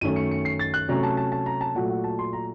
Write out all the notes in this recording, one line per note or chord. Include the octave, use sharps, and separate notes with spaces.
F#2 D#3 A3 C#4 D#7
C#7
C#7
C7
A6
F#6
C3 F#3 A3 C#4 A#5
A5
A5
A5
A#5
A5
A#2 F#3 A3 F#5
F#5
A5
C6
A#5